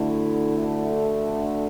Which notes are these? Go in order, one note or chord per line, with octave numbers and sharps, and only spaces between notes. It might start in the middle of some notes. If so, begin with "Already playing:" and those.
Already playing: D2 D3 A3 E4